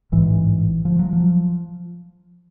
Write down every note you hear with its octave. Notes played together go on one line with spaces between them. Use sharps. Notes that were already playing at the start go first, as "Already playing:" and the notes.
A1 G#2 E3
F3
F#3
F3